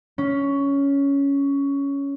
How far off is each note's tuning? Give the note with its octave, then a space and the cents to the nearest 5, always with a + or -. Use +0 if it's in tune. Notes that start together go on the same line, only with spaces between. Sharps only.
C#4 +10